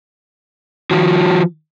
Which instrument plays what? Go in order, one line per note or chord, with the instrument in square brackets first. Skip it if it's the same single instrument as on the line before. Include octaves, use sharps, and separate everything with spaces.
[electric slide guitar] D#3 F3 F#4